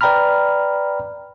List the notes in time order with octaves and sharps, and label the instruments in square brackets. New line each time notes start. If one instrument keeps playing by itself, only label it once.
[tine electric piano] B4 D5 G5 A#5 B5 F6